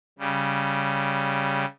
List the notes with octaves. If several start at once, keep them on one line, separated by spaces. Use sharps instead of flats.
C#3 G3